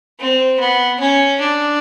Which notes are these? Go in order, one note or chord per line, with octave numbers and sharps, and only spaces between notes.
C4
B3
C#4
D4